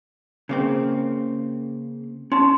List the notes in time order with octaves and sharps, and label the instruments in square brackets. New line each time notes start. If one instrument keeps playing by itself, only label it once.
[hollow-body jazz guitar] C#3 A#3 C4
[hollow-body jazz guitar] C#4 A5 [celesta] C6